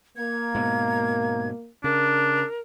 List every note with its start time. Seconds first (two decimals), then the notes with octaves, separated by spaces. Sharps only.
0.17 A#3 G#6
0.55 G#2 B2
1.84 C#3 D4 A#4